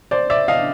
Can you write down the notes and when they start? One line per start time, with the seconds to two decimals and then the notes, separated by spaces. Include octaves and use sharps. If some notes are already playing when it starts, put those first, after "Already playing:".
0.11 C5 D5
0.30 D5 E5
0.48 D#5 F5